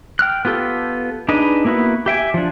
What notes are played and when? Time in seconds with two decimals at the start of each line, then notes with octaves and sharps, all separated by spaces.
0.19 G5 F6 F#6
0.45 B3 F4 G4 A4
1.29 D4 D#4 G#4 B4 D#5
1.65 A#3 B3 E4 F#4 B4
2.06 G4 E5 G5 G#5
2.34 F3 D4